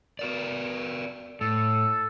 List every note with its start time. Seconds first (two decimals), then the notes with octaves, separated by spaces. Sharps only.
0.19 F#4 A#4 D5
1.41 A2 A4